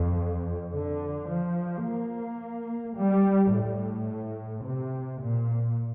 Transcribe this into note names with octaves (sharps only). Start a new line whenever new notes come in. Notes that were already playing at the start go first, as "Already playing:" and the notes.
Already playing: F2
D3
F3
A#3
G3
A2
C3
A#2